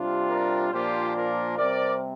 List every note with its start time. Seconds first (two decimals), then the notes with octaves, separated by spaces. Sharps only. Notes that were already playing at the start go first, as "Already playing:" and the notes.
Already playing: C3 G3 D4 F4
0.30 A#4 D5
0.72 A#2 F3 A#3 D4 F4 G4 C5
1.15 F4 A#4
1.57 C3 G3 C4 A#4 D5